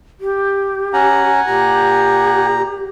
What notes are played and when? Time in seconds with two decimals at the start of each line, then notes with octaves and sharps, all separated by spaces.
0.20 G4
0.93 C#4 F#5 G#5 A#5
1.47 A#2 G4 A#5